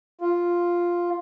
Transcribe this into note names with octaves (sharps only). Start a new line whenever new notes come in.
F4